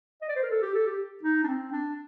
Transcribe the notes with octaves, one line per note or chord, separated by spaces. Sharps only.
D#5
D5
C5
A#4
A4
G4
A4
G4
D#4
D4
C4
D4